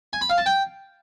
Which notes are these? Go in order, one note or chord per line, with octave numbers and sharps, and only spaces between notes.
G#5
B5
F5
A5
G5